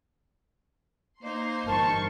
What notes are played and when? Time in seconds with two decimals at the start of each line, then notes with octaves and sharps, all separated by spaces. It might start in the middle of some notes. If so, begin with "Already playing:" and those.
1.23 A#3 D#4 C5 C6
1.68 G1 E3 A#4 A5 C#6